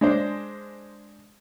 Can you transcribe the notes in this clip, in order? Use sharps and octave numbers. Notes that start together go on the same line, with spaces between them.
G#3 D4 C5